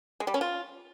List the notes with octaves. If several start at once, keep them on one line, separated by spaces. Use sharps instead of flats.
G#3
G3
C#4
F4